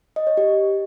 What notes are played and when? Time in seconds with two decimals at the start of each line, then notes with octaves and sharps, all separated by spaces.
0.16 D#5
0.27 C#5
0.37 G4